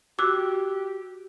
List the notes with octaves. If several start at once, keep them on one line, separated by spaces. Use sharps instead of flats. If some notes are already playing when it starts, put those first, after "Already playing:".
F#4 G4 D6 E6 F#6